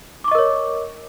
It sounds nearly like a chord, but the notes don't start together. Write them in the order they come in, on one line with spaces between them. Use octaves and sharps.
D6 C#6 D#5 A#4 C#5